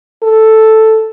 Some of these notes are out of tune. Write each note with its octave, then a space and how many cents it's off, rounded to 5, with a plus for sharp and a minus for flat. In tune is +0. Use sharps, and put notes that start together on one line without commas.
A4 +0